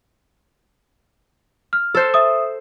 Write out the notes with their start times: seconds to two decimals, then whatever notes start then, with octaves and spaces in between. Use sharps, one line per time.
1.73 F6
1.95 A4 C5
2.14 E5 D#6